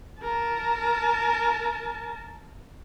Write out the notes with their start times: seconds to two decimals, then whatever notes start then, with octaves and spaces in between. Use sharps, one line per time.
0.21 A#4 A5